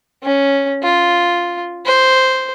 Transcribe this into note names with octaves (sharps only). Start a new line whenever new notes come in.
C#4
F4
C5